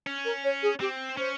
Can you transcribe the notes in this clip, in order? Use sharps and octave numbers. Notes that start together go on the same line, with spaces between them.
C#4
A#4
C#5
G#4
C4 G4
C#4 C5